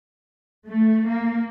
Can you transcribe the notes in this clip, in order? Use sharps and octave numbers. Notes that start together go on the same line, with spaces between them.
A3
A#3